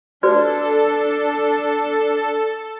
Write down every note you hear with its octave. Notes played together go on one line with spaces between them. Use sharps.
D4 F#4 A4 B4 D5